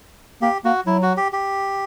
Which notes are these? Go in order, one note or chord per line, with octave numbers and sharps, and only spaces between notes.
A#3 G4
A#3 F#4
F#3 E4
F#4
G4
G4